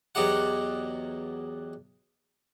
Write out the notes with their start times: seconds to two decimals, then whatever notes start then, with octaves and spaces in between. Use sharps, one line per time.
0.15 E2 F#3 D#4 G4 F#5